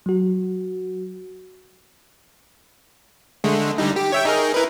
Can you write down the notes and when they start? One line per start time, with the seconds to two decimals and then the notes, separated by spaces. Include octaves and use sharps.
0.06 F#3 F#4
3.44 D3 G#3 A3
3.78 D3 G3 D#4
3.96 G4
4.12 C#5 E5 G5
4.25 D#4 G#4 A#4
4.54 E4 A#4 B4